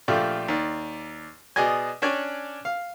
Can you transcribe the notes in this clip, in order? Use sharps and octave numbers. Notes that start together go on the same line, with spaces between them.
A#1 F3 A3 F4 G4 D5
D#2 D5
B2 G#4 D5 D#5 G#5
C#4 D4 C#5 D5 G#5
F5